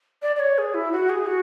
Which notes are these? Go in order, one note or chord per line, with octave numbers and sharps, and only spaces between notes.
D5
D5
C#5
G#4
E4
F#4
G#4
F#4